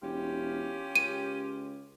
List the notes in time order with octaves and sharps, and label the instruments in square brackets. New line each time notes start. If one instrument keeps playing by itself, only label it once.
[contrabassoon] E1 [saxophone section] C#4 F4 G4
[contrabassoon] C#2 [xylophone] D#7